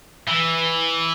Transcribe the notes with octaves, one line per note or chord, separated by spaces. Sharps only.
E3